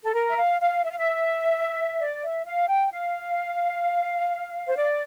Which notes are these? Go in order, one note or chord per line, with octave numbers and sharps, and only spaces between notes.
A4
A#4
E5
F5
F5
E5
F5
E5
D5
E5
F5
G5
F5
C5
D5